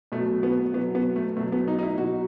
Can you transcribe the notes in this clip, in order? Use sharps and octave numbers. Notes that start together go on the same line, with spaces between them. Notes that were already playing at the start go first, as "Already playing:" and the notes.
B2 F#3 A3
B3
B2 F#3 B3
B3
A3
B2 F#3 A3
B3
D#4
D#4
E4
B2 F#3 F#4